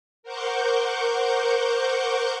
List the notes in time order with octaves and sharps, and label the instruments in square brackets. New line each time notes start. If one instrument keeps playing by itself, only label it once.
[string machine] A#4 C5 F#5 C#6 D6 G6